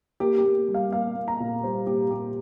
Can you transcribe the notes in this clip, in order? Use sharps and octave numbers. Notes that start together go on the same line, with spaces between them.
A#3 G4
G4
A#3
G3
F5
A#3 F5
A#3
A#5
A#2
G3 C5
A#2 G4
A#2 G4